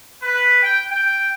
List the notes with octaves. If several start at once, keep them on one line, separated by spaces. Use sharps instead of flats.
B4
G5
G5